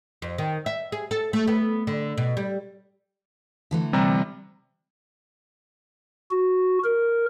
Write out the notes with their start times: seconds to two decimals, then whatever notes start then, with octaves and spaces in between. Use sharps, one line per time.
0.22 F2
0.38 D#3
0.66 E5
0.92 G#4
1.11 A4
1.33 A3
1.48 B3
1.87 D3
2.18 B2
2.37 G3
3.71 D3 E3 A3
3.93 C3 G3 A#5
6.31 F#4
6.84 A#4